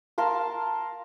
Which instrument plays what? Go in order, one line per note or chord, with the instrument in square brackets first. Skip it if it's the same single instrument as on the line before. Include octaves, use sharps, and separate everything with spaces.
[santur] A#4 F5 A5 C6